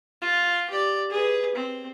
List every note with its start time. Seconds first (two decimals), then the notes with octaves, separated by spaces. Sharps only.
0.22 F4
0.70 G4 D5
1.10 G#4 B4
1.55 C4